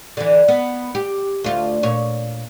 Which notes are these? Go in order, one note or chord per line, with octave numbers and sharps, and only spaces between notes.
D3 E3
B3
G4
D2 F4
A#2 C#5